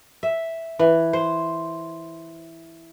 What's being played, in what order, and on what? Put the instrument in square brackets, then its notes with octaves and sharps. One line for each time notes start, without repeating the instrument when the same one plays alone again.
[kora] E5
E3
C5